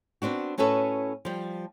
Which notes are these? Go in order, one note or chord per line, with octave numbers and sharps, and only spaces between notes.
B3 C4 D4 F#4
A2 C#4 F#4 A4 B4 C#5
F3 G3